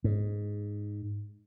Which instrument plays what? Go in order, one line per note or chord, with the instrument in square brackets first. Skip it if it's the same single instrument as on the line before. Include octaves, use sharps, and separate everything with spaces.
[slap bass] G#2